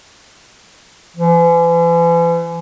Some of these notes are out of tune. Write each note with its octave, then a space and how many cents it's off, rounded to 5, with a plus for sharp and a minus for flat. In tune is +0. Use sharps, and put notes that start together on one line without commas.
E3 +40